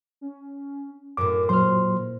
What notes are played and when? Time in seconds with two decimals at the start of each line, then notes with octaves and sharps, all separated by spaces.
0.21 C#4
1.17 F#2 A2 A#4 D6
1.49 A#2 F#3 C5 C6 F6